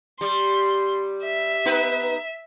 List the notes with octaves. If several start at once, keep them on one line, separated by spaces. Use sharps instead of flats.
G3 C6
E5
B3 D#4 B4